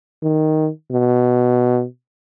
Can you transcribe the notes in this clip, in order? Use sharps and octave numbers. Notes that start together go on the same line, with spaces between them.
D#3
B2